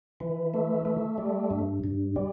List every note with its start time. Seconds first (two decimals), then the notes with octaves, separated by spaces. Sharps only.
0.20 E3
0.54 A3
0.85 A3
1.18 G3
1.50 G2
1.84 G2
2.16 G3